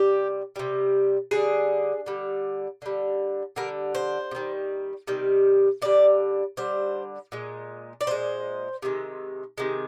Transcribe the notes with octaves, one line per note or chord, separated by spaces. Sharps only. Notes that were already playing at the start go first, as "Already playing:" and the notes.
Already playing: C3 G3 G4
C3 G3
D3 G3 G#4
D3 G3
D3 G3
D3 G3 A#4
C5
C3
D#3 G3
C3 D#3 G3
D3 G3 D5
D3 G3 C5
A#2 G#3
D5
A#2 G#3 C5
C3 D#3 G#3
C3 D#3 G#3